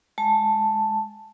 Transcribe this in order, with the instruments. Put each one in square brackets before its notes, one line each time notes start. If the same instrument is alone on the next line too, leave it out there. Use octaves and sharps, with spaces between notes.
[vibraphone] G#3 A5